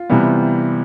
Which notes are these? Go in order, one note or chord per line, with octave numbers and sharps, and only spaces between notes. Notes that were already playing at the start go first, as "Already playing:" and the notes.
Already playing: F4
C3 E3 G3 B3